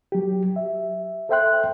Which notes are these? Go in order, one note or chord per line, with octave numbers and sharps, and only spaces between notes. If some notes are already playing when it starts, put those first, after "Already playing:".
F#3 G4
E5
A4 C5 E5 G5 C6 F#6